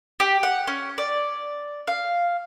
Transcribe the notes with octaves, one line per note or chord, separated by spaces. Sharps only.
G4
F#5
C#4
D5
F5